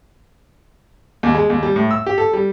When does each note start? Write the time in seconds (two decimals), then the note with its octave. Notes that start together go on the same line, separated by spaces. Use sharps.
1.23 D#2
1.35 G#3
1.50 D#2
1.63 G3
1.76 A2
1.91 E6
2.06 G4
2.18 A4
2.33 G3